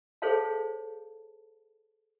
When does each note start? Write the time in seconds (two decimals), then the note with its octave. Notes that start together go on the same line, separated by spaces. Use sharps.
0.22 G#4 A4 C5 C#5 F5 A5